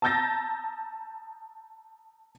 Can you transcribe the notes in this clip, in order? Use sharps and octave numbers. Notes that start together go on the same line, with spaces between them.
A5 A#5 E6 G6 A6 A#6